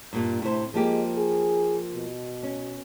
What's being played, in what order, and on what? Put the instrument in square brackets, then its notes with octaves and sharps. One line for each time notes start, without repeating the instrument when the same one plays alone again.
[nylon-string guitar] G2 A#2 G3
A2 C3 C5
[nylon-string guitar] F3 A#3 G4 [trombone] G#3
[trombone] G#4
B2
[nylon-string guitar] C#4